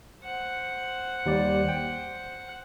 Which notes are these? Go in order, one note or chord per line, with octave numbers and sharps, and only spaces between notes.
C5 F#5
D#2 G3 D5
G5